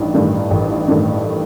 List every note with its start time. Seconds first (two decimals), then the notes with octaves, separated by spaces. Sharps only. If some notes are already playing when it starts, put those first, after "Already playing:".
Already playing: A1 G2 D#3
0.14 G2 D#3 A3
0.51 A1
0.88 G2 D#3 A3